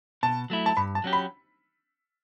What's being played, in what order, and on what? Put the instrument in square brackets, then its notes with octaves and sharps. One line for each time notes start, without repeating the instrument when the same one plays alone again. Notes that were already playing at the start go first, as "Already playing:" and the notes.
[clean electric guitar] B2 [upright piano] A5
[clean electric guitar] F#3 A3 E4
[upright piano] A5
[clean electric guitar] G2 [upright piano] B5
[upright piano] A5
[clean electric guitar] F#3 C#4 G4
[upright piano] B5